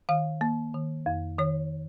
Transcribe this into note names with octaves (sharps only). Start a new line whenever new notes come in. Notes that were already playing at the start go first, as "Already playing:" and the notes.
D#3 F5
A#3
D#3
F2
D#3 C#5